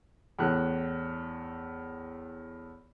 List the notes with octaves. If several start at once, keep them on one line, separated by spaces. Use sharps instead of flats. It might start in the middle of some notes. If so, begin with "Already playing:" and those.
E2 A2 F#6